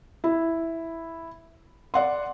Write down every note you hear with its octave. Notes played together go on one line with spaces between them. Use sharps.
E4
D5 F#5 C6